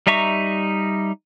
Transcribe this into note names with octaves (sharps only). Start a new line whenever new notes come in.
G3 D#4 E5 A#5 C#6